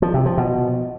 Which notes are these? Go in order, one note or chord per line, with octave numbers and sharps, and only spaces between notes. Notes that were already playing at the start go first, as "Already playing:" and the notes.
F3
C3
F3
B2